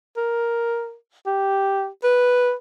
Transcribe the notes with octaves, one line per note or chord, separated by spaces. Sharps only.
A#4
G4
B4